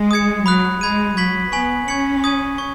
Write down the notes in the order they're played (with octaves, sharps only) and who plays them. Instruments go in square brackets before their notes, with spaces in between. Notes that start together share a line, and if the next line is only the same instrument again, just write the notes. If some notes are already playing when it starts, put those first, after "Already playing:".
Already playing: [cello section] G#3
[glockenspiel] D#6 G#6 C#7
[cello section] F#3 [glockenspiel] B5 D#6 F#6
[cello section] G#3 [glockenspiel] B5 G#6 D#7
[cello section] F#3 [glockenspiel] C#6 G#6 B6 F#7
[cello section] B3 [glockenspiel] G#5 C#6 B6 F#7
[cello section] C#4 [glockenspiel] C#6 G#6 C#7 F#7
[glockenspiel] D#6 G#6 D#7
C#6 G#6